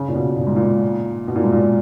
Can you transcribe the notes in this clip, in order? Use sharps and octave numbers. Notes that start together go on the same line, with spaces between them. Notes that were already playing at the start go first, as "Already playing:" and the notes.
Already playing: C#3
A#2
B2
A#2
G#2
A#2
B2
A#2
G#2
A#2